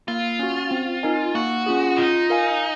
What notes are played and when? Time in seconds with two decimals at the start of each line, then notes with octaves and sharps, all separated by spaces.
0.08 A#3 F4
0.39 C#4 F#4
0.71 C4
1.03 D#4 A#4 D#5 G#5
1.34 A#3 F#4
1.66 C#4 F4 G#4
1.98 D#4 F4
2.30 A#4 F5 G#5